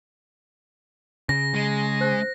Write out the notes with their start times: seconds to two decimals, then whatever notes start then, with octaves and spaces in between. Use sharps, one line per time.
1.29 C#3 A#6
1.55 G#3
2.01 C5 F#6